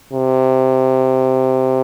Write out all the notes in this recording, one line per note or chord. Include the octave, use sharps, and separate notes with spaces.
C3